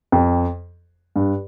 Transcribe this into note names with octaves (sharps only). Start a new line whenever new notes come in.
F2
G2